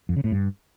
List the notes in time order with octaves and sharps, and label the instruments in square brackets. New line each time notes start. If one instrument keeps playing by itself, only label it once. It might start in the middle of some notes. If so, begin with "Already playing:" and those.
[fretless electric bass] F2
C#3
A2
G2